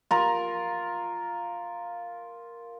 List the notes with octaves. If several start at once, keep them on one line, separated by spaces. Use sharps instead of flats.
F4 A#4